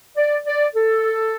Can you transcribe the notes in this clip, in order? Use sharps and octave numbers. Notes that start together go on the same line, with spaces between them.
D5
D5
A4